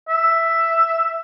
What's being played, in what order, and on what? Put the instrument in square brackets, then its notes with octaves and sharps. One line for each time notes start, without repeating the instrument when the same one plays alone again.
[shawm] E5